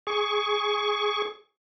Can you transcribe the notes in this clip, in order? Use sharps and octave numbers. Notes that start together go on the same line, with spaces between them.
G#4 C#6